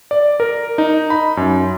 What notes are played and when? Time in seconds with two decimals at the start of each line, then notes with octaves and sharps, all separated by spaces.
0.11 D5
0.40 A#4
0.78 D#4
1.10 B5
1.37 F#2